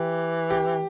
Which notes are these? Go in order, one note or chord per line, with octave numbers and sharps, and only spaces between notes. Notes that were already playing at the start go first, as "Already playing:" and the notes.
Already playing: E3 G4
G4